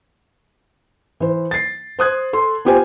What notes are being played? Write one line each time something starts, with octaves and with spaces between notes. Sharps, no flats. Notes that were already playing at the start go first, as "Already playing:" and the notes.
E3 C5
A6 C7
C5 D#6 F#6 G#6
A4 C6
B3 F4 G4 C5 G#5